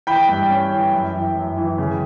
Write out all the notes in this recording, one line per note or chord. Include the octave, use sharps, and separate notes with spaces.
E3 G5 B5
G2
C#4
E3
F#2
E3
F#2
E3
C#3